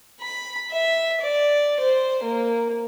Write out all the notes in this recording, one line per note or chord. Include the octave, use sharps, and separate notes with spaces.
B5
E5
D5
C5
A#3